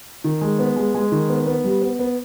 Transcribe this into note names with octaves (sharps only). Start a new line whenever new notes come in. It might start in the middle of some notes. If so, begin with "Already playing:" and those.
D#3
G#3
B3
G#3
G#3
D#3
B3
B3
G3
B3
B3